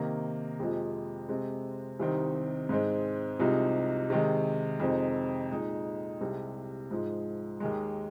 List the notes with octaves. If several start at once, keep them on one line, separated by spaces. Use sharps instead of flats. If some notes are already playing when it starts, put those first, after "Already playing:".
Already playing: C3 D#3 A#3
F2 C3 F3 G#3
C3 G#3 C4
C2 C3 D#3 C4 D#4
G#2 G#3 C4
C2 C3 F3 G#3 D#4
C3 D#3 G#3
F2 C3 G#3 C4 D#4
A#2 G#3 D#4
C2 C3 G#3
G#2 F3 G#3
D#2 D#3 G#3